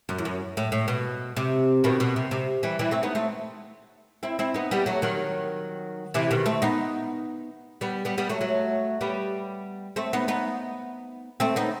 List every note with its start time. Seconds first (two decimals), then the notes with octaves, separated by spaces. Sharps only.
0.09 F#2
0.18 E2
0.25 F#2
0.57 A2
0.72 A2
0.88 B2
1.37 C3
1.84 B2 D#3
2.00 B2
2.16 C3
2.31 C3
2.63 E3 G3
2.79 E3 G3
2.91 A3 C4
3.03 B3 D#4
3.15 A3 C4
4.23 C4 E4
4.39 C4 E4
4.54 B3 D#4
4.71 G3 B3
4.86 F#3 A3
5.02 D#3 F#3
6.14 C3 E3
6.31 B2 D#3
6.46 A3 C4
6.62 B3 D#4
7.81 G3 B3
8.05 G3 B3
8.18 G3 B3
8.29 F#3 A3
8.41 F#3 A3
9.01 G3 B3
9.96 A3 C4
10.13 B3 D#4
10.28 B3 D#4
11.40 A3 C4
11.56 B3 D#4